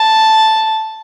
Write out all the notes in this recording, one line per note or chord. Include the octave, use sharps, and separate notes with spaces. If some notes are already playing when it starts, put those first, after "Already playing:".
Already playing: A5